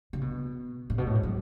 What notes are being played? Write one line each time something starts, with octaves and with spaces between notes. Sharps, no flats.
C#3
B2
A2
B2
A2
G#2
F#3